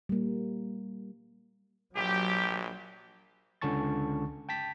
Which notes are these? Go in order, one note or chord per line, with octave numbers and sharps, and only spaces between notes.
G3 A#3
A#1 F#3 G4
C#2 D3 C#4 A5 C#6 A6
G5 A5 B6